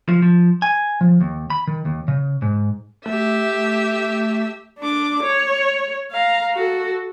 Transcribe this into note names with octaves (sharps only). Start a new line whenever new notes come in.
F3
F3
G#5
F3
D#2
B5
D#3
D#2
C#3
G#2
A3 G4 E5
D4 D6
C#5
F5 A#5
F#4 A4